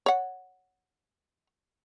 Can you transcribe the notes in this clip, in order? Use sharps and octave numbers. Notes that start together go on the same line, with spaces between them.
C#5 F#5